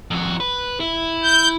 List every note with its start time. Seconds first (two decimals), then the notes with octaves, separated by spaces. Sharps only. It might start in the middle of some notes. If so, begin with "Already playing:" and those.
0.11 F2 F#4
0.40 B4
0.80 E4
1.23 G6